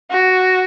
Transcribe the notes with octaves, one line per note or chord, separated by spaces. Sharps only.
F#4